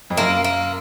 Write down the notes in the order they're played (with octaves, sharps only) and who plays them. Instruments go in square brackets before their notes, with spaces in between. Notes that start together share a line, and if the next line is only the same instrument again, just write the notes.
[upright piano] F2
[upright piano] F#2 [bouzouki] A#3
[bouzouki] A#3